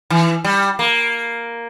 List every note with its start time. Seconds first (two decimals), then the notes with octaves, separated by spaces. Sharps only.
0.10 E3
0.44 G3
0.79 A#3